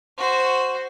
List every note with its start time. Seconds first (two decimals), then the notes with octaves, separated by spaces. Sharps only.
0.18 F#4 C5